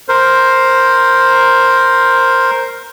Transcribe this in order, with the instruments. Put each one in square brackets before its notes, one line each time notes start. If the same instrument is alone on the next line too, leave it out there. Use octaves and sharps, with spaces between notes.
[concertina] A#4 C5